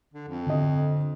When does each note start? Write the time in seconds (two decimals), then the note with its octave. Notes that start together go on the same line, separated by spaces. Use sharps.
0.14 D3
0.28 F2
0.46 D3 D#5